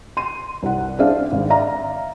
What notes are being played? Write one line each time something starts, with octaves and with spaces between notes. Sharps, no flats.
C6 D#7
C2 F#5
C4 D4 G#4 D5 E5 F5
G#1
D5 E5 F5 A#5